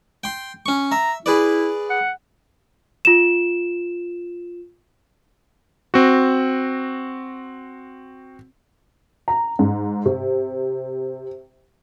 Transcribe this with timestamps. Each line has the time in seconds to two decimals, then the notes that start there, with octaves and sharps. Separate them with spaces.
0.24 G5 C6
0.66 C#4 C#6
0.92 E5 A#5
1.26 E4 G#4 B4 D5
1.90 F#5
3.05 F4 E7
5.94 C4 F#4
9.28 A#5
9.59 G#2
10.06 C3